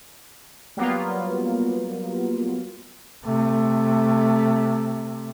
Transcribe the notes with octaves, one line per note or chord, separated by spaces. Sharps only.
F#3 G3 A#3 B3 F4
C3 A3